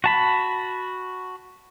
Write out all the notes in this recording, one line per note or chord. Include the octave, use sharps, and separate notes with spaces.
F#4 A5 B5